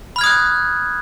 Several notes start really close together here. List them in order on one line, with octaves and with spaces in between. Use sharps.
B5 F6 G#6 D#6 F#6